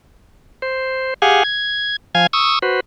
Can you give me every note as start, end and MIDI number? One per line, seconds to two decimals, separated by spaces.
0.62 1.14 72
1.22 1.43 67
1.22 1.43 68
1.22 1.43 77
1.22 1.43 78
1.22 1.43 80
1.44 1.96 92
2.15 2.27 53
2.15 2.27 77
2.15 2.27 80
2.15 2.27 92
2.33 2.59 85
2.33 2.59 87
2.33 2.59 88
2.62 2.80 66
2.62 2.80 71
2.62 2.80 72